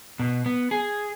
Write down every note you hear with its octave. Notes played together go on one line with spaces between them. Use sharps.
B2
B3
G#4